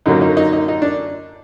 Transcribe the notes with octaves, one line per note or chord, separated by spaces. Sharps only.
F#2 D3 F#3 A#3 C#4 D#4
D#4
D#4
D#4
D#4
D4